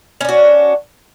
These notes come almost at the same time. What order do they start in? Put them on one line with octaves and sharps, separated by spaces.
C#4 D4 F#4